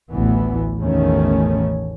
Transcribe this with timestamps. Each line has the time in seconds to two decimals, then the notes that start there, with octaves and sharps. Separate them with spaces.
0.12 A1 D2 E3 B3
0.79 A1 E2 B2 D#3 A3 C#4